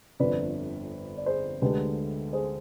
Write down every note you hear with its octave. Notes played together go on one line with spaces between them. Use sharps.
G1 F2 D3 B4 D5
D5
G#4 C5
D2 D3 G#3 G4 B4
G#4 C5